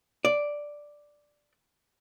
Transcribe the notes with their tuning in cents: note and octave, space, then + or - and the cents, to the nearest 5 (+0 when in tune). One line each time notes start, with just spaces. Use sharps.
D5 +0